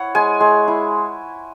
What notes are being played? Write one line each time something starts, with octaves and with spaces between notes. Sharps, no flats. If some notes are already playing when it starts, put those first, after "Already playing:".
Already playing: E4 C#5 F#5
G#3 G#5
G#3
E4